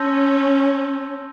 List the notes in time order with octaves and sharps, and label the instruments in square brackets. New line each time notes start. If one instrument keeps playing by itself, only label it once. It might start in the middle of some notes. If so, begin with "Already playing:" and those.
Already playing: [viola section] C#4 [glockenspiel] A5 C6 E6 G6 A#6